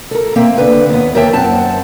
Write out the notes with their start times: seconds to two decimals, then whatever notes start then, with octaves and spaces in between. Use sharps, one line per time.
0.11 A4 A#4
0.36 A#3 C4 E5
0.58 D3 B4
0.89 D#2 B3
1.15 D#2 A#4 C#5 E5 G5 A5
1.33 F#2 C4 F#5 A5